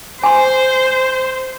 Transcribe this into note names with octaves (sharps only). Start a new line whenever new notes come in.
C5 G#5 C6